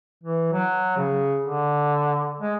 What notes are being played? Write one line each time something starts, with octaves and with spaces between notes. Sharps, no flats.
E3
F#3
C#3
D3
G#3